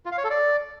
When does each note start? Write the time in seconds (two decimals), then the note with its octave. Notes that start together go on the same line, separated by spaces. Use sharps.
0.06 F4
0.12 F5
0.18 C#5
0.24 A4
0.30 D5